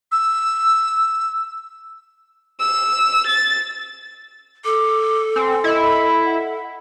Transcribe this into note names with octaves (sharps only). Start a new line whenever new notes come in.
E6
E6
A6
A4 D6
C4 G#5
E4 D#5
F#5